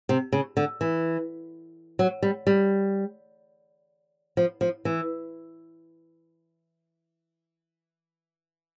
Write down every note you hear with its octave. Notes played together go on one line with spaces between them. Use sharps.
C3
C#3
D3
E3
F#3
G3
G3
F3
F3
E3